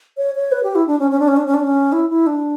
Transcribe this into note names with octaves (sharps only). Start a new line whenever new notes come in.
C#5
C#5
B4
G4
E4
D4
C#4
C#4
D4
C#4
D4
C#4
D4
C#4
E4
E4
D4